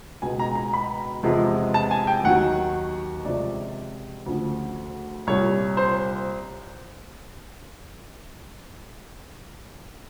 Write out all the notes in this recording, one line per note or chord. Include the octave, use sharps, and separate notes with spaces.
C#2 B2 G#3 G#5
A#5
A#5
B5
E2 C3 F3 G#3
A5
G#5
G5
D#2 D#3 F#3 F#5
C#2 C3 F3 G#3 D5
D2 C#3 F3
C2 A#2 G3 C#5
C5